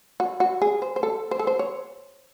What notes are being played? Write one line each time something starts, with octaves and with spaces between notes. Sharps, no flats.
F#4
F#4
G#4
C5
C5
A4
C5
A4
C5
C#5